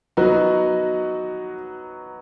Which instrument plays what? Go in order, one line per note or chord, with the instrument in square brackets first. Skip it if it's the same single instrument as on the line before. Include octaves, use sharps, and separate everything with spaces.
[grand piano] F#3 B3 D#4 F#4